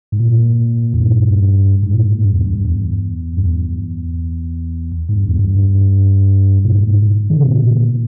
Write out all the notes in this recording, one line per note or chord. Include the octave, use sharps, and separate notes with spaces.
G#2
A#2
E2
G2
G#2
A#2
G#2
G2
E2
G2
E2
G2
E2
G#2
G2
E2
G2
A#2
G#2
D#3
C#3
B2
A#2